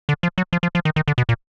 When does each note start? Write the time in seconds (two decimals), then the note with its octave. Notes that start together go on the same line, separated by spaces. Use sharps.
0.09 D3
0.23 F3
0.38 F#3
0.53 F3
0.63 F3
0.75 F3
0.85 D#3
0.96 D#3
1.08 D3
1.18 B2
1.29 A#2